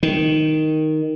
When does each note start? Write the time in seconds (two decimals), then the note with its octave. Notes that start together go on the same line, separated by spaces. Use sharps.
0.03 D#3